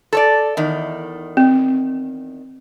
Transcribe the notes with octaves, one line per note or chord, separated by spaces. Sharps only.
A4 C#5 D5
E2 D#3
C4